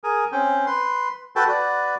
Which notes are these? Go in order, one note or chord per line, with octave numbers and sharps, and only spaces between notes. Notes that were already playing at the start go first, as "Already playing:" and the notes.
G#4 A#4 G#5
C4 C#4 G5
B4 C6
F#4 A4 B4 G5 A5
F#4 B4 D5